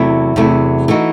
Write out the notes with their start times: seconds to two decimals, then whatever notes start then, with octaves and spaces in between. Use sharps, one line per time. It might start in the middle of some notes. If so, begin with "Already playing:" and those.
Already playing: E2 C3 F#3 A3 E4
0.36 E2 C3 F#3 A3 E4
0.88 E3 A3 D#4 F#4